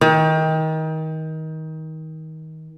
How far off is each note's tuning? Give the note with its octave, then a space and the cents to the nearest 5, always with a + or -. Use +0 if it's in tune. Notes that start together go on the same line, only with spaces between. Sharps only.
D#3 +25